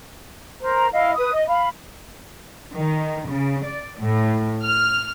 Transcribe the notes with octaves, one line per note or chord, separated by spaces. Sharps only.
A#4 C5 A#5
E4 D#5 F5
B4 D#6
D#5
F5 B5
D#3
C#3
D5
A2
F6